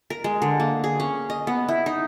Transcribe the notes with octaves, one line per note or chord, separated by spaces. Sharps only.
A#4
G#3
D3
A#3
G#4
C#4
D#5
B3
E4
D#4